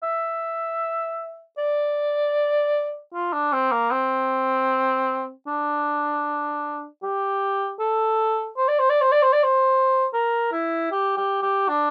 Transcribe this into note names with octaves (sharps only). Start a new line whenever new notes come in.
E5
D5
F4
D4
C4
A#3
C4
D4
G4
A4
C5
D5
C5
D5
C5
D5
C5
D5
C5
A#4
E4
G4
G4
G4
D4